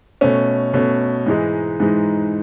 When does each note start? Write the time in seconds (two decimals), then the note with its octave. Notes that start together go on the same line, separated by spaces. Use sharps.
0.21 B2 A3 C#4
0.74 B2 A3 C#4
1.26 G#2 E3 G#3 D#4
1.80 G#2 E3 G#3 D#4